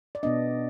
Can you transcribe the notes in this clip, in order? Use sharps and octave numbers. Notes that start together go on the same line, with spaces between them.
D5
B2 B3 D4 D#5